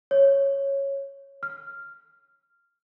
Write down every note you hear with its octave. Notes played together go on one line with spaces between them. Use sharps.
C#5
F6